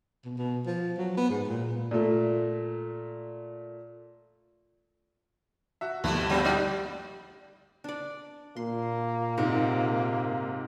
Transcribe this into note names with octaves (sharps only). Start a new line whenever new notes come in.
B2
B2
F3
F#3
B3
G#2
A#2
A#2 A3
F#4 E5
D2 G2 A#2 F3 G3 A3 A#3 E4
A#2 C#3 G3 C4 F#4 B5
G#2 G3 D#4 D5
D4 D5
A#2 A#3 C6
G#2 C3